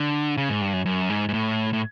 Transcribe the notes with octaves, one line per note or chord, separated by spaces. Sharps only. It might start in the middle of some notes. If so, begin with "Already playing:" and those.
Already playing: D3
C#3
G#2
G2
F#2
F#2
G#2
G#2
A2
A2